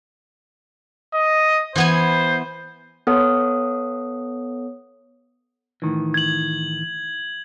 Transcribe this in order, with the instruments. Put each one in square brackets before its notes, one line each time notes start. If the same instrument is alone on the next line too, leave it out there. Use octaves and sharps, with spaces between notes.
[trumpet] D#5
[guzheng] E3 B3 G#5 [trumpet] C5
[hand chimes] B3 A4 C#5 F#5 D#6
[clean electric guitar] A2 D#3 E3
[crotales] G#6 F#7